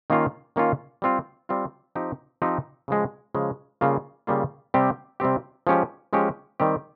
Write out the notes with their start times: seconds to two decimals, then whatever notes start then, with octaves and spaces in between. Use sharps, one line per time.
0.10 D#3 A#3 C#4 F4
0.56 D#3 A#3 C#4 F4
1.02 G3 C4 F4
1.49 G3 C4 F4
1.95 F3 C4 D#4 G4
2.42 F3 C4 D#4 G4
2.88 C#3 F3 G#3
3.34 C#3 F3 G#3
3.81 C#3 G3 A#3 F4
4.27 C#3 G3 A#3 F4
4.74 C3 G3 C4 G4
5.20 C3 G3 C4 G4
5.67 F3 G#3 C#4 G4
6.13 F3 G#3 C#4 G4
6.60 D#3 G3 C4 G4